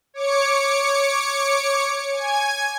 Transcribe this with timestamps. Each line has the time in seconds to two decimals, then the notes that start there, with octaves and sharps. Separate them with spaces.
0.14 C#5 D6 C#7
2.12 G#5 G#6